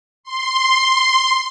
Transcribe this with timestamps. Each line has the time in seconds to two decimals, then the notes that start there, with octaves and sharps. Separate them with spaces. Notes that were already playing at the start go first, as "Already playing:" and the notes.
0.24 C6